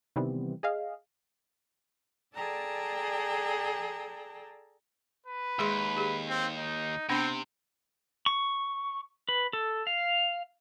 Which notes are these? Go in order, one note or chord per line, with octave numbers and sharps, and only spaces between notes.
C3 D#3 E3 G3 B3 C4
G#4 D#5 F5
G#4 A4 D5 G5 A5 A#5
B4
D#2 G#3 G#4 C6
G4 G#4
C4
D#4
C3 B3 C4 D4 B5
C#6
B4
A4
F5